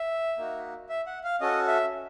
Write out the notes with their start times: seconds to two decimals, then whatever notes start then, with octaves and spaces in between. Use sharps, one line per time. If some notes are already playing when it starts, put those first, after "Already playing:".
Already playing: E5
0.38 A#3 D#4 F#4
0.89 E5
1.07 F#5
1.24 F5
1.41 C#4 F#4 A4 D#5
1.67 E5